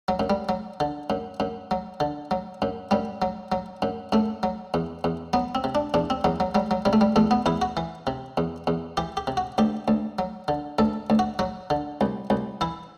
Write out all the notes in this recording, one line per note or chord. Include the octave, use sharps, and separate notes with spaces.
F#3
F#2
G3
F#3
D3
F#2
F#2
F#3
D3
F#3
F#2
F#2 G3
F#3
F#3
F#2
F#2 A3
F#3
E2
E2
F#3 B3
C4
C3
D4
E2 D4
C4
E2 F#3
F#3
F#3 G3
F#3
C3 G3
A3
G3
E2 A3
B3
E2 E4
F#4
E3
C3
E2
E2
E3 G4
G4
C3
F#4
D2 G4
D2
F#3
D3
D2 A4
D2
F#4
F#3 F#4
D3
C2
C2
E3 E4